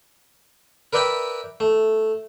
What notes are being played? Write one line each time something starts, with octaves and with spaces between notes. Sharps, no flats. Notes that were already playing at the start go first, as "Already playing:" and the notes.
A#4 B4 D5 E5 G5 B5
A3